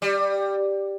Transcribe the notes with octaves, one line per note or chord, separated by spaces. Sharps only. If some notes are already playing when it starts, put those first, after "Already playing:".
G3